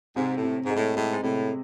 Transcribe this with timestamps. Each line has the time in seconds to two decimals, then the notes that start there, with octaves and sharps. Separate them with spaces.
0.16 G#2 C3
0.36 A2
0.43 C3
0.65 G#2
0.70 G#3
0.76 A2
0.96 A2 G#3
1.12 G#2
1.23 A2 C3